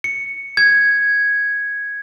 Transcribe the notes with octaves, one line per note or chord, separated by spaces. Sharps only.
C#7
G#6